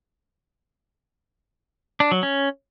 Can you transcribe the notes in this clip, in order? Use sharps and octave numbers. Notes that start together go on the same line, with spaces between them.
D4
F#3
C#4